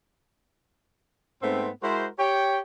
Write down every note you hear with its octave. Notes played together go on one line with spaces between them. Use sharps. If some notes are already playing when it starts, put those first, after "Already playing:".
G#2 A3 B3 C4
G#3 E4 F#4 A#4 C5
G4 C#5 G5